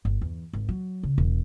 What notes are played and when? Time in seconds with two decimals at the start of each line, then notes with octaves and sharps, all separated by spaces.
0.05 G1
0.21 E2
0.53 G#1
0.69 F#3
1.03 C#3
1.18 E1